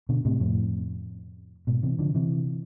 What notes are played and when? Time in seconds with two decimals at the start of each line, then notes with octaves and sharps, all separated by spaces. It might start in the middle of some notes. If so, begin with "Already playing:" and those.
0.09 B2 D3
0.25 A2 C3
0.40 F2 A2
1.67 G#2 B2
1.83 C3 E3
1.99 D3 F3
2.15 C3 E3